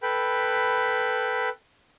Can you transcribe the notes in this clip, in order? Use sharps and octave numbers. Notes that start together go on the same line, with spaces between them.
A4 B4 G5 B5